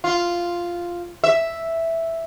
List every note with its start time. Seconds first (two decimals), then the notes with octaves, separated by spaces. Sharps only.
0.04 F4
1.24 E5